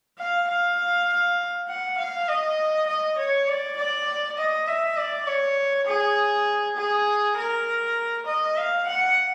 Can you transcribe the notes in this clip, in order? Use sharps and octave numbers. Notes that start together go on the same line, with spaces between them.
F5
F5
F#5
F5
D#5
D#5
C#5
D5
D5
D#5
E5
D5
C#5
G#4
G#4
A#4
D#5
F5
F#5